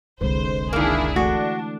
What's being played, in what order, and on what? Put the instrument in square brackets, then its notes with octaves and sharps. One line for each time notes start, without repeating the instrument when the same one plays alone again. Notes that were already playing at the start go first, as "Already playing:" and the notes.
[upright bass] F1 C2 [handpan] D3 G#3 B4 [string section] C5
[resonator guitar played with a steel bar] D#3 A#3 [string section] D4 E4 G#4
[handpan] E3 A3 [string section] D4 [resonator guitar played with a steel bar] F#4